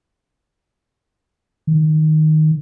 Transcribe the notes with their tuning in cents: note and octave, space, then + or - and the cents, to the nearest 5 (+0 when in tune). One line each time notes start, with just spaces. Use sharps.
D#3 +0